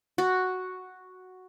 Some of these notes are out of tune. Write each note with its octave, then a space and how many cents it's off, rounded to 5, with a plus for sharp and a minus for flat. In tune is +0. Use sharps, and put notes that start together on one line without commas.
F#4 +0